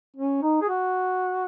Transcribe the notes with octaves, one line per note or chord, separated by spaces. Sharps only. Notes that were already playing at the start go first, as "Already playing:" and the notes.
C#4
D#4
G#4
F#4